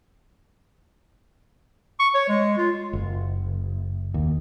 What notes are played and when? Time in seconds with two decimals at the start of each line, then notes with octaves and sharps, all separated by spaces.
2.00 C#6
2.14 C#5
2.28 G#3
2.58 F4
2.93 F#1
4.14 D#2